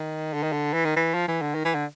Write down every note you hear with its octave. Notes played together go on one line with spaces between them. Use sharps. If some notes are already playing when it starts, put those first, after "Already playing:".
Already playing: D#3
D3
D#3
D3
E3
D#3
E3
F3
E3
D3
D#3
E3
D3